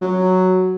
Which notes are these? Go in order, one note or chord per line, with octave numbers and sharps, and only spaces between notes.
F#3